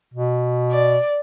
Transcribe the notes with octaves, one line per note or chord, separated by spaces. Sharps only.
B2
D5